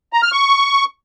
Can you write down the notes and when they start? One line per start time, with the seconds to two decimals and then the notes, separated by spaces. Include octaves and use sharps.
0.13 A#5
0.23 F6
0.32 C#6